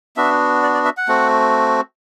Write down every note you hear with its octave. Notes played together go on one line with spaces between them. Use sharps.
B3 D4 F#4 E5
D5
D5
E5
F#5
A3 C4 F#4